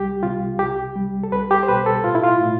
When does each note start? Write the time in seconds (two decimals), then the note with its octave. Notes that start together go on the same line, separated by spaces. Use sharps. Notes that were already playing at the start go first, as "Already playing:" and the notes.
Already playing: C2 G3 G4
0.23 C3 F4
0.59 C2 G4
0.96 G3
1.23 A4
1.32 C2 B4
1.51 G4
1.63 C5
1.68 B2 B4
1.86 A4
2.04 A2 F4
2.15 E4
2.23 F4
2.41 A2